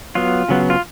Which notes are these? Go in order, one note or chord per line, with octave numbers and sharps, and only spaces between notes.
F#3 B3 F4
C#3 F#3 B3
F4